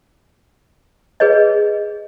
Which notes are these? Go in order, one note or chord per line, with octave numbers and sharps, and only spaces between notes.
G#4 B4 C#5 D#5